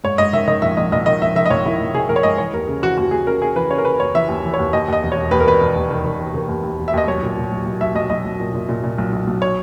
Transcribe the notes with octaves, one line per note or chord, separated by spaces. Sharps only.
G#2 C#5
G#2 D#5
D#3 E5
D#3 D#5
A#1 E5
A#1 D#5
A#1 D#5
D#3 D#5
A#1 E5
D#3 E5
D#5
A#1 C#5
D#3 E4
A#1
D#3 G#4
A#1 A#4
C#5
G#2 D#5
E3 C#5
D#2 A#4
C#3
E3 F#4
D#2 F#4
D#2 G#4
C#3 A#4
C#3 G#4
E3 B4
C#3 C#5
A#4
C#3 B4
D#2 C#5
E3 E5
D#2
E3
D#2 C#5
D#2 D#5
D#2 D#5
E1
C#5
E1
D#2 B4
A#4
E1 B4
E1
D#2
D#3
D#3
E1
D#3
D#2
D#2
E1
E5
D#2 D#5
B1 C#5
A#2
A#2
B1
B1
B1 E5
B1 D#5
B1 D#5
B1
A#2
A#2
A#2
A#2
B1
B1
B1
C#5